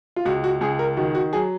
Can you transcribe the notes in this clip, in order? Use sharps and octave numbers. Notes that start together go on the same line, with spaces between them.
F4
C#2 F#4
F#4
C#2 G#4
A#4
D#3 F#4
F#4
F#3 G#4